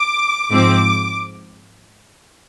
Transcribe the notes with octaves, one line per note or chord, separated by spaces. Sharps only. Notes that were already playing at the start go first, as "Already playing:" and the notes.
Already playing: D6
G#2 F3 C4 D6